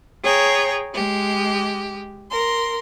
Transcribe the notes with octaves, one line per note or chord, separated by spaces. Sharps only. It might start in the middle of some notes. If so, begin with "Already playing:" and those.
G#4 C#5 G5 A#5
G#3 G4
A#4 C6